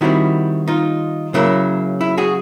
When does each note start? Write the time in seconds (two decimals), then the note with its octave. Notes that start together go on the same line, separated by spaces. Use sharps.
0.01 D#3 G3 C4 E4 F#4
0.68 D#4 F4
1.34 C#3 F#3 A#3 E4
2.01 E4
2.17 F#4 G#4